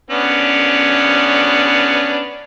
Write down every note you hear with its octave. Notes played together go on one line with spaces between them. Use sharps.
B3 C#4 D4